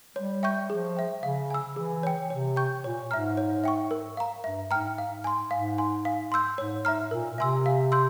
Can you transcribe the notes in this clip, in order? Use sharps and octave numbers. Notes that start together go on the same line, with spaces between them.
G3 C#5
E5 G5 C#6 G6
F3 G#4
E5 G5
C#3 F5
G#5 E6
E3 G#4
C#5 G5
C3 C#5
G5 C#6 G6
A#2 C#5
G#2 E5 A#5 F6
C#5
E5 G5 C#6
A#4
F5 A#5
G2 E5
G#2 G5 A#5 F6
G#2 F5
G#5 C6
G#2 F5
G#5 C6
F5
C6 E6 G6
G#2 C#5
G#2 E5 A#5 F6
A#2 A#4
C3 E5 G#5 C6 E6
F5
C6 E6 G6